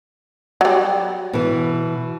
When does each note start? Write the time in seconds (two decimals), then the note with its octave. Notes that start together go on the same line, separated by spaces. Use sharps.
0.61 F#3 G3
1.33 B2 E3